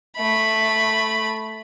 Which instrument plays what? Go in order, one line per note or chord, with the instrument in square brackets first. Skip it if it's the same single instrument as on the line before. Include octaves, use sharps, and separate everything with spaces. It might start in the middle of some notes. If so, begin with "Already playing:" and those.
[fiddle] A3 B5